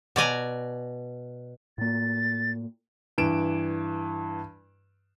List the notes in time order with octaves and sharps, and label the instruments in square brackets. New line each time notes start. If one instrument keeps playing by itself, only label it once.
[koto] B2 D5 G#5 A#5
[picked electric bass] A2 A#3 [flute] A6
[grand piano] G2 E3 D7 E7